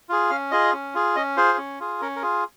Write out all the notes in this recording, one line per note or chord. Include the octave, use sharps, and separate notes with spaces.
F4 G#4
C#4 F5
F4 G#4 D#5
C#4
F4 G#4
C#4 D#5
F4 G#4 C5
C#4
F4 G#4
C#4 A#4
A#4
F4 G#4